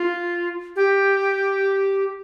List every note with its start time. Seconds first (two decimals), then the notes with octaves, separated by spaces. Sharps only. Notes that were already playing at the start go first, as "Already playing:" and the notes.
Already playing: F4
0.76 G4